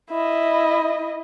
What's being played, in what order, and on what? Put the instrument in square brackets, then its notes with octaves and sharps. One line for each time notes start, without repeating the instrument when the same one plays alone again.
[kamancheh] E4 D#5